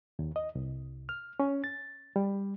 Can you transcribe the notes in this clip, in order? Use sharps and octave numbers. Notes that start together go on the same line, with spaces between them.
D#2
D#5
C2
F6
C#4
A6
G3